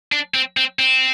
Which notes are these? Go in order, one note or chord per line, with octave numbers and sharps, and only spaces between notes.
D4
C4
C4
C4